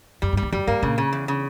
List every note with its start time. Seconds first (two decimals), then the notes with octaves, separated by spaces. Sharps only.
0.22 F#2 G3
0.33 G2
0.37 G3
0.42 E2
0.52 F#2 G3
0.67 G2 A#3
0.82 A#2 C#3
0.98 C#3
1.13 E2
1.28 C#3